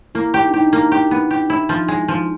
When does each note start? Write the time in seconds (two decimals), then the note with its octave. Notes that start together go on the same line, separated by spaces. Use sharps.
0.15 A#3 E4
0.34 G4
0.41 D#4
0.49 D4
0.54 D#4 G4
0.66 D4
0.73 A#3
0.92 G4
1.11 B3
1.31 G4
1.50 E4
1.69 F3
1.88 G#3
2.08 F3